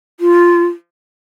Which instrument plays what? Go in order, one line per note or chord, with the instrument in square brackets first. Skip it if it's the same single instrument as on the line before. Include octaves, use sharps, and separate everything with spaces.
[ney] F4